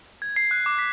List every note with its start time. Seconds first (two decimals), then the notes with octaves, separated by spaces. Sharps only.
0.22 G#6
0.36 C7
0.51 F#6
0.66 D6
0.79 B6